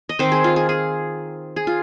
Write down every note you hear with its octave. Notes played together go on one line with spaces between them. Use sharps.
D#5
D#3 C4 D#4 C5
G#4
F4
G#4
G#4
G#4
F4